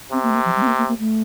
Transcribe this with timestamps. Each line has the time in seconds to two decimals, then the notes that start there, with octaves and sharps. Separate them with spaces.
0.12 C3 C4
0.23 A#3
0.30 A3
0.35 A#3
0.45 F3
0.56 G3
0.62 C4
0.67 A#3
0.78 A#3
0.88 A#3
0.99 A3